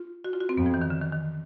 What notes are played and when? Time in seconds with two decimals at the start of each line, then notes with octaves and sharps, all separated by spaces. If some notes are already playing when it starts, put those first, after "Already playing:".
Already playing: F4
0.24 F#4
0.33 F4
0.41 F#4
0.49 C4
0.57 F2 B3
0.66 F3
0.74 E3
0.82 D#3
0.90 D3
1.01 D#3
1.13 D#3